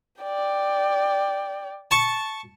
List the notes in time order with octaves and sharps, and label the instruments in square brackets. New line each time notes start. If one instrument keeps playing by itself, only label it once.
[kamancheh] D5 G5
[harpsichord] A5 C#6